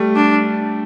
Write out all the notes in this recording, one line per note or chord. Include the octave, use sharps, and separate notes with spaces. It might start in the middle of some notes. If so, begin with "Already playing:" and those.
Already playing: G3 A3
D4